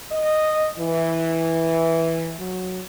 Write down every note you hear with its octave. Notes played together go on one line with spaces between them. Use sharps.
D#5
E3
F#3